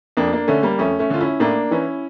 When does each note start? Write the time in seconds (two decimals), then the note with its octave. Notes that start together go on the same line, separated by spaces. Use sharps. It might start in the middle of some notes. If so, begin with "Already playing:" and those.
0.17 F2 A#3 D4
0.33 A#3 D4
0.47 D3 A3 C#4
0.63 G3 A#3
0.79 F2 A3 C#4
0.99 A3 C#4
1.10 D3 F4
1.21 C#4 E4
1.40 A2 A#3 D4
1.71 E3 C#4 E4